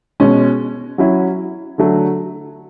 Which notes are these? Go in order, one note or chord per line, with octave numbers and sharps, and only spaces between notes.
B2 G#3 C#4
F#3 C#4 E4
D3 F#3 A3